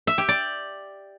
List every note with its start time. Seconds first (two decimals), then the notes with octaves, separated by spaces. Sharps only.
0.07 E5
0.18 G4
0.28 D5